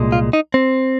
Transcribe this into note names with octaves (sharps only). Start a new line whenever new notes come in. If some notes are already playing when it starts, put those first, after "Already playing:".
Already playing: C2 A#2 G#3
F4
D#4
C4